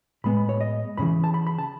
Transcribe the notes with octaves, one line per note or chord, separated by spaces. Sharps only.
A2 G#3 B3 B5
B5
C#5
D#5
F#2 C#3 E3 B5
A5
B5
B5
A5